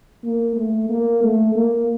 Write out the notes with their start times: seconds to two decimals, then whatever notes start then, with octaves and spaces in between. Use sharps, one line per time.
0.24 A#3
0.57 A3
0.89 A#3
1.23 A3
1.55 A#3